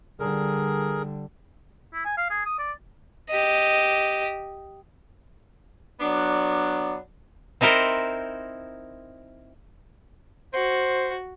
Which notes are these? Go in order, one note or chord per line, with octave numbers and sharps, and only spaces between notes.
D3 G3 G#4 A#4
E4
G#5
F5
G#4
D#6
D5
G4 D#5
F#3 B3 D4 D5
C4 D#4 E4 A#4 C5
F#4 C5